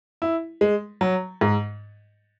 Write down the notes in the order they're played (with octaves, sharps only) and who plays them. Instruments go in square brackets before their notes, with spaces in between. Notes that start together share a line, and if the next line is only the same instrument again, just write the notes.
[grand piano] E4
G#3
F#3
G#2